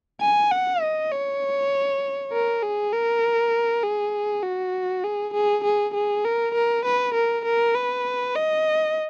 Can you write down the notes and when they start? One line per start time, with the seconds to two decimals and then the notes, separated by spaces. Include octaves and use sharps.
0.21 G#5
0.51 F#5
0.82 D#5
1.12 C#5
2.33 A#4
2.63 G#4
2.93 A#4
3.83 G#4
4.44 F#4
5.04 G#4
5.34 G#4
5.64 G#4
5.94 G#4
6.25 A#4
6.55 A#4
6.85 B4
7.14 A#4
7.45 A#4
7.75 B4
8.35 D#5